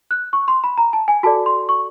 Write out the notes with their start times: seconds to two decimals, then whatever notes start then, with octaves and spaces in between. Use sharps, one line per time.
0.11 F#6
0.33 C#6
0.48 C6
0.64 B5
0.78 A#5
0.93 A5
1.08 G#5
1.23 F#4 A4 D5 A5
1.46 C6
1.69 C#6